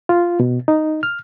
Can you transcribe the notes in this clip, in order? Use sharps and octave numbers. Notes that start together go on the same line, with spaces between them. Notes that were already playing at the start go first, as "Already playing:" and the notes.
F4
B2
D#4
F6